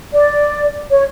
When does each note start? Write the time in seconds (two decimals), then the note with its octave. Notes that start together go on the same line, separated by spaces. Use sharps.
0.13 D5
0.90 C#5